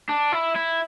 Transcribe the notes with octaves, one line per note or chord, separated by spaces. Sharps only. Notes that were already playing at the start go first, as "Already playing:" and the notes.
D4
E4
E4